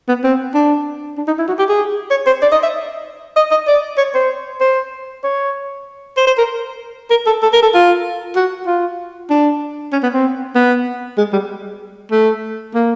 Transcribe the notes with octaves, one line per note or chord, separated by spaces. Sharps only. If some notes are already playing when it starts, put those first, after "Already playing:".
B3
C4
D4
D4
D#4
E4
F#4
G4
G#4
C#5
C5
D5
D#5
E5
D#5
D#5
D5
C#5
C5
C5
C#5
C5
C5
A#4
A#4
A4
A4
A#4
A4
F4
F#4
F4
D4
C#4
B3
C4
B3
G#3
G3
A3
A#3